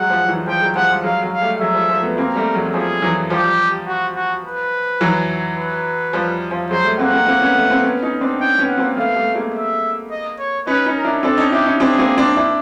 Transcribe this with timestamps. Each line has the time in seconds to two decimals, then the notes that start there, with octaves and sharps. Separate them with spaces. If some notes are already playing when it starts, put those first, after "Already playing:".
Already playing: F#3 G#3 F#5
0.10 F3 G3
0.28 E3 F#3
0.47 F3 G3 G5
0.61 F#3 G#3
0.76 F3 G3 F#5
0.90 F3 G3
1.04 F#3 G#3 F5
1.22 F#3 G#3
1.33 F5
1.42 G3 A3
1.60 F#3 G#3 E5
1.74 F3 G3
1.89 F3
2.03 A3 B3
2.17 A#3 C4 A#4
2.36 G3 A3
2.55 F#3 G#3
2.65 F#3
2.74 F3 G3 G#4
3.02 E3 F#3
3.30 F3 G3 G4
3.87 F#4
4.15 F#4
4.45 B4
5.01 E3 F#3
5.57 B4
6.13 F3 G3
6.51 F3
6.70 F#3 G#3 C5
6.85 G3 A3
6.98 A#3 C4 F#5
7.13 A#3 C4
7.26 A#3 C4
7.41 B3 C#4
7.55 A3 B3
7.70 A#3 C4
7.83 B3 C#4
8.02 C#4 D#4
8.21 C4 D4
8.40 C#4 D#4 G5
8.59 B3 C#4
8.69 F#5
8.78 A#3 C4
8.97 A3 B3 F5
9.16 G3 A3
9.35 G#3 A#3
9.53 E5
10.11 D#5
10.39 C#5
10.67 C#4 D#4 B4
10.86 C#4 D#4
10.96 A#4
11.04 D4 E4
11.23 C4 D4 A4
11.37 C#4 D#4
11.52 D4 E4 G4
11.66 C#4 D#4
11.80 C4 D4 G#4
11.98 A#3 C4
12.18 C4 D4
12.36 D4 E4